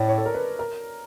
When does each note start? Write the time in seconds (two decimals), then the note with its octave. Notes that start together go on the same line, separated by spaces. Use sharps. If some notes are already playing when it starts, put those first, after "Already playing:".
Already playing: A2 D5
0.09 C#5
0.17 A4
0.26 A#4
0.34 B4
0.59 A#4